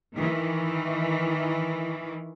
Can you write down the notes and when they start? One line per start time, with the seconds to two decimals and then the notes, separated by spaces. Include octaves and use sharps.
0.14 D#3 E3